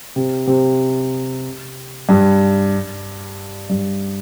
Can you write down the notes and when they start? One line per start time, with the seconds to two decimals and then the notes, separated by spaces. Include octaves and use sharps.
0.16 C3
0.47 C3
2.09 G2
3.69 G2